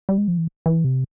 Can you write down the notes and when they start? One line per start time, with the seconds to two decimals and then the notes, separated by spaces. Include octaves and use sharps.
0.09 G3
0.18 G#3
0.28 F3
0.38 E3
0.66 E3
0.84 C3